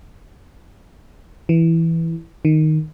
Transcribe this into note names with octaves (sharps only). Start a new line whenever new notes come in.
E3
D#3